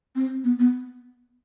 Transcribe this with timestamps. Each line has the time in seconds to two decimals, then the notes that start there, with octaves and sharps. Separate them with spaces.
0.16 C4
0.44 B3
0.59 B3